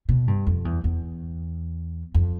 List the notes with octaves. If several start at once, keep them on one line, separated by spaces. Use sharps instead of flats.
B2
G2
F2
E2
E2
F2